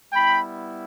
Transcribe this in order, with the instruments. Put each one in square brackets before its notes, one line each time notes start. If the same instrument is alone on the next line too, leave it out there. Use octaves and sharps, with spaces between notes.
[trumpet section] G3 B3 E4 G5 B5